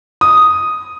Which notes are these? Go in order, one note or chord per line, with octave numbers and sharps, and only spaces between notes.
D#6